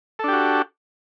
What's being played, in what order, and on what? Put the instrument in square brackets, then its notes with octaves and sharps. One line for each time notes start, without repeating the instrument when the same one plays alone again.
[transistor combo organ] A4
D4
G4
F#4